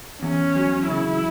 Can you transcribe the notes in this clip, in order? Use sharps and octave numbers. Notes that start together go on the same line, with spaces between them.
E2 C#4
F#3
C#3 E4